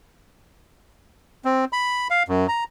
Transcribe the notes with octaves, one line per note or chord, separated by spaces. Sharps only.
C4
B5
F5
F#2
A#5